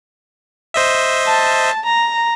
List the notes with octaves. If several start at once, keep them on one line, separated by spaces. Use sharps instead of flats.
C5 D#5 E5
A5
A#5